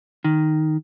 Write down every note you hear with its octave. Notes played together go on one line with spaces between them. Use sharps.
D#3